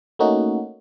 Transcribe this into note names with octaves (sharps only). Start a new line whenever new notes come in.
A3 A#3 C#4 D#4 F#4